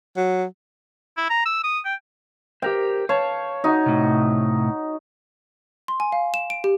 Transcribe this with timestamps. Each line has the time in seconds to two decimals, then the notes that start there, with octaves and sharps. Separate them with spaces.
0.17 F#3
1.17 E4
1.30 A#5
1.46 E6
1.64 D#6
1.85 G5
2.62 G4 A#4 C5 G5
3.09 C#5 F5 A5
3.64 D#4 F#4
3.86 A2 C3
5.88 C6
6.00 G#5
6.12 F5
6.34 E7
6.50 D7
6.64 G4